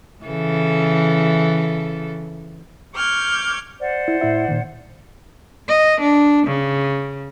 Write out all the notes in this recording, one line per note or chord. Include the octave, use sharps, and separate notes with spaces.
C#3 E3 A4
C#6 D6 F6 G6 G#6
C5 D5 F#5
E4
A2 E4 E5
A#2 D#3
D#5
D4
C#3